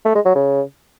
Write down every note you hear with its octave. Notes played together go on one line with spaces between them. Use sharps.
A3
G#3
F#3
C#3